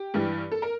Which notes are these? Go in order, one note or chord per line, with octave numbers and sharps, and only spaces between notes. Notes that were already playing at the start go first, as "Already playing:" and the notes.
Already playing: G4
G2 E3 G3
A4
A#4